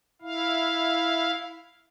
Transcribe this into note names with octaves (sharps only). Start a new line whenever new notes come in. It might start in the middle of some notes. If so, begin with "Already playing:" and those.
E4 F5